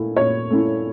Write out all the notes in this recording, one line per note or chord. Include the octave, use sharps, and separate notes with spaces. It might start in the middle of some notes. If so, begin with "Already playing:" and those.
Already playing: A#2 A3 E4
A#2 C#5
A3 C#4 E4